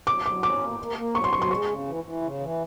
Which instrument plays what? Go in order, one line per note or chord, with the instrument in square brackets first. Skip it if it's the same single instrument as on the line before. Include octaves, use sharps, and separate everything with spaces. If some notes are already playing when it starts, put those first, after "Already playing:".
[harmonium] F#3 [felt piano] D6
[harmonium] F#3 [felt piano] D6
[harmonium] C#4 [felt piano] D6
[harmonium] A#3
A#3
A#3
[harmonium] F#3 [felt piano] C#6
[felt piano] C6
[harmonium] F#3 [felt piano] C#6
[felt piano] C6
[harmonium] G#3 [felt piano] C#6
[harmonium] C#3
E3
E3
C#3
E3